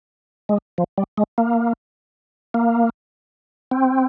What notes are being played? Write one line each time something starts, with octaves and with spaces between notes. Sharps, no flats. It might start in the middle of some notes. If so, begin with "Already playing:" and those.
G#3
F3
G3
G#3
A#3
A#3
C4